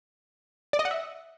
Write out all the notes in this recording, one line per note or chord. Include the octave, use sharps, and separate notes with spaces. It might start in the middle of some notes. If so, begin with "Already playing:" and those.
D5
D#5
F#5
E5